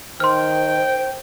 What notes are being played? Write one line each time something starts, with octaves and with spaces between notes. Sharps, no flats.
D#3 C5 G5 C6 F6